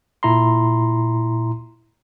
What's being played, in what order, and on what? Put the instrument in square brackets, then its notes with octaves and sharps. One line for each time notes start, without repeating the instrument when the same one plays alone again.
[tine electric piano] A#2 E4 A#5 C6